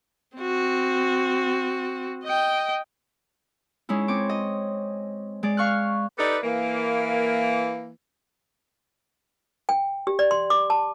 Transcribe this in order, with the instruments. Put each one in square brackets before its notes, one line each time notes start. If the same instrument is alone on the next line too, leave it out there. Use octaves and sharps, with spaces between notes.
[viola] C4 F#4
D#5 G5
[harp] G#3 C#4 D#4 E4
C4 C#5 D6
D#5
G#3 D5
F5 C#6 F6 F#6
[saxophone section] D#4 G4 A4 B4 D5
E3 A#3
[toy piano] G5
G4
D5
C6
D6
A5